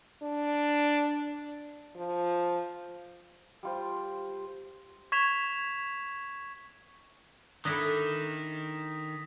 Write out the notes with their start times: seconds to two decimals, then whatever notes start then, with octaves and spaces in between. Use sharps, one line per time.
0.23 D4
1.96 F3
3.63 G3 F4 C5
5.12 C#6 G#6 B6 E7 F7
7.65 D#3 D4 E4 A4 D#6 A#6 B6